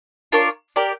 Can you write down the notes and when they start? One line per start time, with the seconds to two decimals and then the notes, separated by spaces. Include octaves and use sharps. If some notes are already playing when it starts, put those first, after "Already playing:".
0.32 D4 F4 A#4 C#5
0.76 G4 A#4 D5